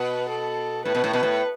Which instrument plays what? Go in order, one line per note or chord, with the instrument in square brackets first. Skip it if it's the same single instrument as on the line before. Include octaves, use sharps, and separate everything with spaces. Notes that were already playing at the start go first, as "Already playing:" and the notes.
Already playing: [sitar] B2 [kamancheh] B4
[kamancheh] A4
[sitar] A2 [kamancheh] B4
[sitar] B2
A2
[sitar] B2 [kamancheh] B4
[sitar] A2